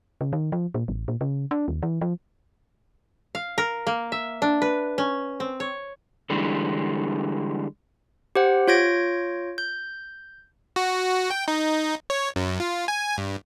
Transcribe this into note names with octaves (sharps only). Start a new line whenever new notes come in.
C#3
D#3
F3
A#2
A1
A#2
C#3
D4
D#2
E3
F3
F5
A#4
A#3
E5
D4
B4
C#4
C4
C#5
D3 E3 G3 G#3
G4 C5 F#5
F4 C#5 G6 G#6 A#6 D7
G6
F#4
G5
D#4
C#5
F#2
F4
G#5
G2